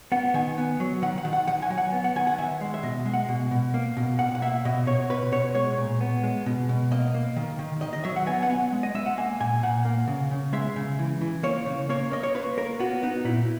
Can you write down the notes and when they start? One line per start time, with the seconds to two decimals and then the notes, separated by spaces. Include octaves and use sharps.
0.12 B3 F#5
0.34 D#3 G#5
0.58 B3
0.80 F#3
1.02 D#3 F#5
1.18 F#5
1.25 D#3
1.33 F#5
1.47 D#3 F#5
1.62 G#5
1.70 F#3
1.78 F#5
1.92 B3
2.04 F#5
2.16 D#3 G#5
2.27 F#5
2.38 D#3 E5
2.61 G#3
2.74 E5
2.83 B2 D#5
3.06 G#3
3.14 F#5
3.29 B2
3.51 B2
3.74 A#3
3.97 B2
4.19 B2 F#5
4.35 F#5
4.42 A#3 E5
4.65 B2 D#5
4.87 B2 C#5
5.10 B2 B4
5.32 B2 C#5
5.55 G#3 C#5
5.77 A#2
6.01 B3
6.24 G#3
6.46 B2
6.69 B2
6.92 A#3 D#5
7.14 A#3
7.36 D#3
7.59 D#3
7.81 D#3 D#5
7.93 D#5
8.04 F#3 E5
8.16 F#5
8.26 B3 G#5
8.43 F#5
8.50 B3
8.72 G#3
8.83 D#5
8.95 G#3 E5
9.06 F#5
9.17 A#3 G#5
9.40 A#2 G#5
9.63 A#2 F#5
9.85 A#3
10.07 C#3
10.31 C#3
10.53 G#3 E5
10.76 C#3
10.99 E3
11.21 E3
11.43 A#3 C#5
11.66 C#3
11.89 A#3 C#5
12.11 A#3 D#5
12.23 C#5
12.34 A#3 B4
12.57 A#3 A#4
12.80 B3 F#4
13.03 B3 D#4
13.24 A#2 E4